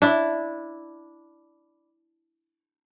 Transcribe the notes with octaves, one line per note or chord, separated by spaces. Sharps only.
D4 E4